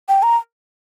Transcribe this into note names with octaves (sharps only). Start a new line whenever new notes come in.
G5
A#5